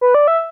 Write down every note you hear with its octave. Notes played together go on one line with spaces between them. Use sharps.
B4
D5
E5